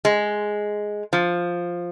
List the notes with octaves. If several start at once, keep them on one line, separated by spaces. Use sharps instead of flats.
G#3
F3